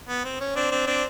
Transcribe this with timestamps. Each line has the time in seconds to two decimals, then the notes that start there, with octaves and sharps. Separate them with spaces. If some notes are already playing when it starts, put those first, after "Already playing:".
0.09 B3
0.24 C4
0.40 C#4
0.56 C4 D4
0.71 C4 D4
0.87 C4 D4